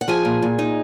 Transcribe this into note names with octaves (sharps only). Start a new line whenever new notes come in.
F#5
F3 G#4 G#5
A#2
A#2
D#4